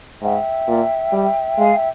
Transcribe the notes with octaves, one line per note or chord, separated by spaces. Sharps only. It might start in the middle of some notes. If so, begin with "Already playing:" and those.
G#2 E5 G5
A#2
G3
G#3 F5 G#5
E5 G5